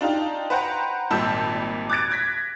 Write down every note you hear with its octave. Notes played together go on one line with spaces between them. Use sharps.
D4 D#4 F4 G4
B4 C5 F#5 G5 A#5
G#1 A#2 G3 A5 E6 G6
D6 F#6 G#6 A6 D7
F#6 G#6 A#6 B6